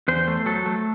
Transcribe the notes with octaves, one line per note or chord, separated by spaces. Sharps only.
E2 C5
A3
F#3 A4
A3